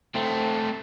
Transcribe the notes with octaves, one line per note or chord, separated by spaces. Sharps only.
A3 C4